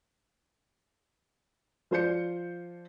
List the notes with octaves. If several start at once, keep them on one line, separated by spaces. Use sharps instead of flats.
F3 F4 C5 D5 G6 C#7